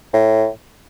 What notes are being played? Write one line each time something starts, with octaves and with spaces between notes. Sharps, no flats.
A2